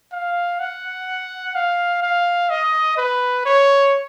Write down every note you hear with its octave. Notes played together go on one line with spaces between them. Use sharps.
F5
F#5
F5
F5
D#5
B4
C#5